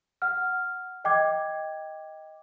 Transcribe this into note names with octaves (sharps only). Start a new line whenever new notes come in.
F#5 F6
D#5 G5 D6 G#6